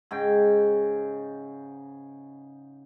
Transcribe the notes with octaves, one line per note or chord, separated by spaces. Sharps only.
G#2 C#3 G5